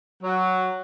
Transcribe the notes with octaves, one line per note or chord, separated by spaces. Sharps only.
F#3